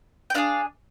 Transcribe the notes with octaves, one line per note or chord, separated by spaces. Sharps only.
G5
D4 F4 G#4 D5 F5